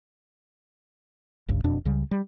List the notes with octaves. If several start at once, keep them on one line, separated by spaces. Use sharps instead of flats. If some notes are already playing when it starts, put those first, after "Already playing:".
G1 C#2 G2
E1 F2 B2 D4
C#2 C#3 G3
G3